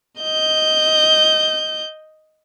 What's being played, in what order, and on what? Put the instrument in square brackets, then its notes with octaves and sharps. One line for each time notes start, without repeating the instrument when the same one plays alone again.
[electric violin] D#5 G6